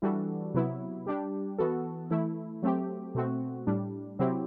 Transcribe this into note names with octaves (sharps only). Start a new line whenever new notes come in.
E3 G3 D4 F#4 A4
C3 F#3 B3 E4
G3 D4 G4
E3 B3 F#4 A4
E3 A3 E4
F#3 A3 C4 G4
B2 A3 C4 F#4
A2 G3 D4
C3 F#3 C4 E4 G4